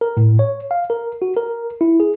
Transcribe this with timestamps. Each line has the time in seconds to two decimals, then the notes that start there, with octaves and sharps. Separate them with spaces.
0.01 A#4
0.17 A2
0.39 C#5
0.71 F5
0.90 A#4
1.22 F#4
1.36 A#4
1.81 E4
2.00 G#4